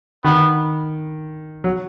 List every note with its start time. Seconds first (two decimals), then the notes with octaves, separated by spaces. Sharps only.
0.24 D#3 B3
1.64 F#3